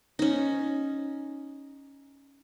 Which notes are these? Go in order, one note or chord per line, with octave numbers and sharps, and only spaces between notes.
C#4 D#4